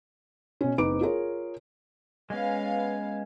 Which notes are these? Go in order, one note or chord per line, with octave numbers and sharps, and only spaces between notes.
B2 C#4
F#1 C4 D#4 B4 D6 D7
F4 G#4 A#4 C#5
G#3 B3 C#4 F5